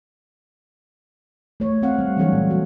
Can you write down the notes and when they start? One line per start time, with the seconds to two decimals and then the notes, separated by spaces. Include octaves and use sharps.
1.60 A3 C#5
1.82 C4 F5 F#5
1.99 G3
2.17 E3 F#3 A3 D4 A4 C#5
2.32 A#2 G3
2.50 G3 F#4